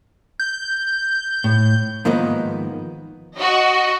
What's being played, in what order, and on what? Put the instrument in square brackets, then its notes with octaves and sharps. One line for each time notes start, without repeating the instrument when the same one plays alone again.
[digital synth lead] G6
[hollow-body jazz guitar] A2
G#2 D#3 F3 A#3 B3 D#4
[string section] F#4 D#5